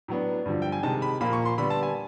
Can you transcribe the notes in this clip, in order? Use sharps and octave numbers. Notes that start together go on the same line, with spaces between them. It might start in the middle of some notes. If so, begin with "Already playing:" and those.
A2 F#3 B3 D4
G2 D3 F3
G5
G#5
C3 D#3 G#3 A5
B5
A#2 F3 A#3 B5
C#6
C6
D3 G3 B3 B5
A5
G#5